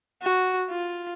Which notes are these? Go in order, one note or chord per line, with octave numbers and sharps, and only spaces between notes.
F#4
F4